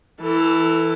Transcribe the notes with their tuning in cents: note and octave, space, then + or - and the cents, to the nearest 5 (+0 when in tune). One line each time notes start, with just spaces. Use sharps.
E3 +0 A4 +25